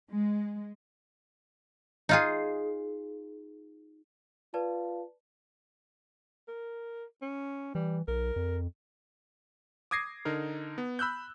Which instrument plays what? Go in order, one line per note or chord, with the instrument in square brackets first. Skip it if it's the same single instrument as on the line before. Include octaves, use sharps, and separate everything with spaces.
[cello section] G#3
[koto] D#4 F4 G#4
[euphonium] F4 [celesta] B4 D5 A5
[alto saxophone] A#4
C#4
[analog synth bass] E3 [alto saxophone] G3
[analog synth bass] B1 [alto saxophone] A#4
[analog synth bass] F2
[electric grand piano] D6 D#6 G#6 A#6 C7
D3 D#4 A#4
B3
B5 E6 F#6 G6